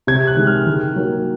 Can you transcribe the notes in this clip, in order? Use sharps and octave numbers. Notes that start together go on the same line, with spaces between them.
C3 G#6
F#6
D#3 G#3
F6
D#3
F#3 A#3